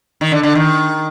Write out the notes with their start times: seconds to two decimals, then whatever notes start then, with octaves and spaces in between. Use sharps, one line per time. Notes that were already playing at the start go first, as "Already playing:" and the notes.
0.21 D#3
0.32 D3
0.43 D3
0.55 D#3